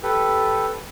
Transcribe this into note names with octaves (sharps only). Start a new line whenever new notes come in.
G4 A4 B4